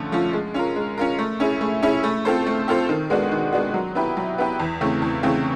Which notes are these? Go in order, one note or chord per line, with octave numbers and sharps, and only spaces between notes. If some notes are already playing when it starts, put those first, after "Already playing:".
Already playing: D3 F3 A3 C#4
F3 A3 C#4 F4
G#3
C#4 F4 A#4
G#3
C#4 F4 A#4
A3
C#4 E4 G#4
A3
C#4 E4 G#4
A3
C4 F4 A4 C5
A3
C4 F4 A4 C5
D#3
G#3 B3 D4 F#4
D#3
G#3 B3 D4 F#4
F#3
B3 E4 G4 B4
F#3
B3 E4 G4 B4
E2
C#3 E3 A3 C4
E2
C#3 E3 A3 C4